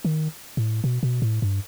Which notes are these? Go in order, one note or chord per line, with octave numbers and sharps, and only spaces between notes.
D#3
A2
B2
B2
A2
G2